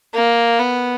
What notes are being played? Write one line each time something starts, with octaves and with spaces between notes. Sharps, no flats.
A#3
B3